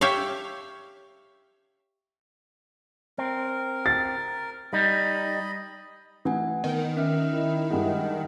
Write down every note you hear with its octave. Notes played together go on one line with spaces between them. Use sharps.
G4 C#5 E5 F5
C4 A#4
A6
G3 D#4 D#5 B5
E3 A3 F#5 G#5
D#3 B3
C#4 E5 F6
E4
G2 G#3 F#5 G5